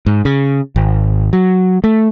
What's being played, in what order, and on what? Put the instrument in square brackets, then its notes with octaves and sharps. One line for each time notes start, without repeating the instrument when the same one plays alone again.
[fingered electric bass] G#2
C#3
G#1
F#3
A3